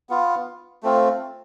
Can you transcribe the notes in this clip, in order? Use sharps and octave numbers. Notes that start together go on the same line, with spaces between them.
B3 F4
A3 C4 F4